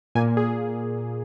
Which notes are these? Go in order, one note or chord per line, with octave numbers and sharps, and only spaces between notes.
A#2 A#3 G#5
G#4